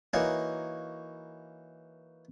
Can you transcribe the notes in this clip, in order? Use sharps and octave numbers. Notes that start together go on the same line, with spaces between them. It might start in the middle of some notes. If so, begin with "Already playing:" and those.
E3 A#3 D#4 F#4 C#5